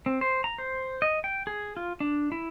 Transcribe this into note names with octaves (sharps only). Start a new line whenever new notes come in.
C4
C5
A#5
C5
D#5
G5
G#4
F4
D4
E4